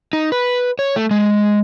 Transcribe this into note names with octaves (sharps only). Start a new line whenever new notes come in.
D#4
B4
C#5
A3
G#3